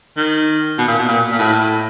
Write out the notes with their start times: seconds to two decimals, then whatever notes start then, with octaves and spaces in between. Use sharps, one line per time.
0.17 D#3
0.78 B2
0.88 A#2
0.99 B2
1.08 A#2
1.31 A#2
1.39 A2